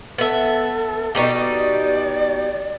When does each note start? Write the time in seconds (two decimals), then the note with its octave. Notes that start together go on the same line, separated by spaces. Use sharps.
0.18 B3 A4 E5
1.15 B2 D#4 G4 D5